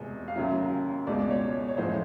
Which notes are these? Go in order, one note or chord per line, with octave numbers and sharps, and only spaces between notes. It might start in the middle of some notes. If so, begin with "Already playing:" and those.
Already playing: F1 E2 B2 G#3
F5
D#2 C#3 F#3 E5
C#2 B2 G#3 D5
D5
C#5
C#5
A1 A2 F3 G#3 C5